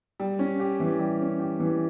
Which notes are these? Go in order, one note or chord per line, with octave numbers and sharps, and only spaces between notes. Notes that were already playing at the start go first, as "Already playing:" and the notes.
G3
C#4
G4
E3
G3
C#4
G4
E3